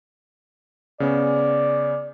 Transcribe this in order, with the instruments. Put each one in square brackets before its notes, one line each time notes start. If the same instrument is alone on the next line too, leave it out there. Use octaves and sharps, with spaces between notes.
[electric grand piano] C#3 B3 C#4 [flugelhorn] D5